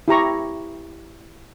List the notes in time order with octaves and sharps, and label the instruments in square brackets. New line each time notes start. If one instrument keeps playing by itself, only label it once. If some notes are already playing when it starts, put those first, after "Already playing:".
[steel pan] E4 G4 A#5 C#6